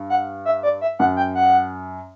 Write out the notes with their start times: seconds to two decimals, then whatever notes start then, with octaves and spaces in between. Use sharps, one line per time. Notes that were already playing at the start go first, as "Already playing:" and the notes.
Already playing: G2
0.10 F#5
0.45 E5
0.63 D5
0.81 E5
0.99 F#2 F#5
1.17 G5
1.35 F#5